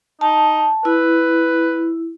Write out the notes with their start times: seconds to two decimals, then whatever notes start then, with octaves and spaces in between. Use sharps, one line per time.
0.21 D#4 A5
0.85 E4 B4